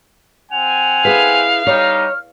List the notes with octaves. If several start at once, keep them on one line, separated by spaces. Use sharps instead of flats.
C4 F#5 G#5 F7
E4 G#4 B4 F5
G3 D#4 C#5 F6